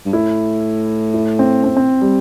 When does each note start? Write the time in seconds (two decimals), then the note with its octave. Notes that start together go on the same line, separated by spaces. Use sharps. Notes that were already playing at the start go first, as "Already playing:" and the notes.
0.05 G2
0.13 A2 E4
1.14 E4
1.39 C4
1.64 C4
1.77 C4
2.02 G3